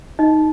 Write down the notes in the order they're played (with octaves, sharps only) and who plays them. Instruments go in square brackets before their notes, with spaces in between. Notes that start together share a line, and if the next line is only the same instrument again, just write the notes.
[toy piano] D#4 D#5